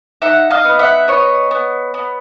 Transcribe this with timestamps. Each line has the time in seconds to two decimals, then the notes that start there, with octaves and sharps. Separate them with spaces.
0.22 D#4 E5 F#5
0.50 D#5 F5
0.65 B3
0.79 E5 F#5
1.08 B3 C#5 D#5
1.51 B3
1.94 B3